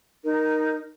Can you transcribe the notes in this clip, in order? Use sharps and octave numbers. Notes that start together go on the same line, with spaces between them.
D#4 A#4